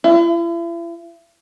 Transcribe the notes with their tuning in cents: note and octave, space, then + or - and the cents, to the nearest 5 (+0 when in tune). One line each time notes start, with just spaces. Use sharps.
E4 +40